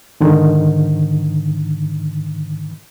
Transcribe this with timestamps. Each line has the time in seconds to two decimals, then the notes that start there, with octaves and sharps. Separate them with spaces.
0.20 G#2 D3 D#3